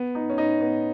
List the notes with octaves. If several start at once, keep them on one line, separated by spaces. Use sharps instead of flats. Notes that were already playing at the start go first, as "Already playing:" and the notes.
Already playing: B3
D#4
C#4
D#4
B3